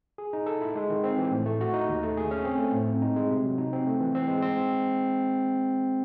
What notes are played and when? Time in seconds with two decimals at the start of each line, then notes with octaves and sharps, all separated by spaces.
0.18 G#4
0.33 D#4
0.46 A4
0.61 E4
0.75 G#3
0.90 D#3
1.04 C4
1.18 E3
1.32 A2
1.46 A3
1.61 F#4
1.74 D#4
1.89 D#2
2.03 A3
2.17 G#4
2.31 C#4
2.44 C4
2.58 A3
2.73 A2
2.87 C4
3.02 D#4
3.16 G#3
3.30 C3
3.44 F#3
3.58 D#4
3.73 C4
3.87 A3
4.00 E3
4.15 C4
4.28 G#3
4.42 C4